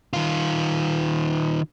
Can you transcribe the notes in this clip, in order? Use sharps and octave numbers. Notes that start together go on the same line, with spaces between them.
D#3 F4